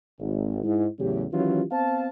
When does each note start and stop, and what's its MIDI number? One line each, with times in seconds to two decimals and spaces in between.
0.19 0.62 32
0.64 0.86 44
0.64 0.86 64
0.99 1.25 40
0.99 1.25 45
0.99 1.25 49
0.99 1.25 54
0.99 1.25 67
1.32 1.63 51
1.32 1.63 52
1.32 1.63 54
1.32 1.63 61
1.32 1.63 65
1.32 1.63 67
1.71 2.08 59
1.71 2.08 60
1.71 2.08 72
1.71 2.08 77
1.71 2.08 81